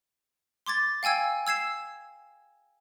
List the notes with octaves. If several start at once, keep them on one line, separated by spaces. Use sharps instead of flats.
C6 D6 G#6 A6
F5 G5 G#5 E6 G#6
E6 G#6 C7 E7